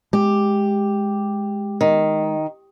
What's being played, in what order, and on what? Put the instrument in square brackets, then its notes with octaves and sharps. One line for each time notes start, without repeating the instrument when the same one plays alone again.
[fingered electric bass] G#3 [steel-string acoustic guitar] G4
[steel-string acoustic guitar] D#3